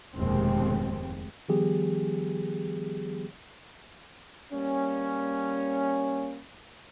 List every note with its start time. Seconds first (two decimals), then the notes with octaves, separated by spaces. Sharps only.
0.16 F1 D#2 G#2 B2 G#3 C4
1.49 D#3 F3 G3 B3 G4 G#4
4.52 G3 A#3 C#4